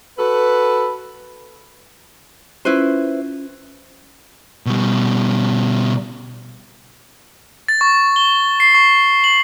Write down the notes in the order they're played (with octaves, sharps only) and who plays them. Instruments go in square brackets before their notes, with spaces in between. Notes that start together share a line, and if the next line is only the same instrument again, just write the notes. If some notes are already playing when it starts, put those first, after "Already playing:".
[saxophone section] F#4 A4 B4
[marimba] C#4 F4 [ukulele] E4 B4 C5
[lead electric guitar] B2 G3
[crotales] A6
C#6
G7
C7
C#6
F#7